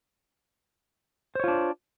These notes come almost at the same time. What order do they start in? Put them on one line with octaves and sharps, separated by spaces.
C5 C#5 F4 D4